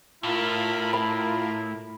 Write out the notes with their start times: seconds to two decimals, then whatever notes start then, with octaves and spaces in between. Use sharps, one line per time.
0.23 A2 E4 F4 A#4 F5 B5
0.93 E4 B5